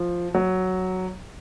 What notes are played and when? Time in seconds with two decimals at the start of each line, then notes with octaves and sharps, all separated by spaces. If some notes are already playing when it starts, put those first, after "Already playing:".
Already playing: F3
0.35 F#3